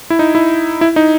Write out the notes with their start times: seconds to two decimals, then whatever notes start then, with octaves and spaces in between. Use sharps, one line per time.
0.10 E4
0.19 D#4
0.35 E4
0.81 E4
0.96 D#4